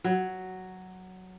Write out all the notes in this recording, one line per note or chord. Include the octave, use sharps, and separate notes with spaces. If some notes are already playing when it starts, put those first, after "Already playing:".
F#3